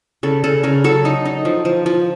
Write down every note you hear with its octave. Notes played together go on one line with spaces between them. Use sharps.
C#3 A4
C#3 A4
C#3 A#4
F#3 A4
D#4
D#4
F3
F3
F3